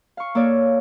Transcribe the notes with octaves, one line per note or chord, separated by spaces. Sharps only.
F5 C#6
A#3 A4 C#5 D5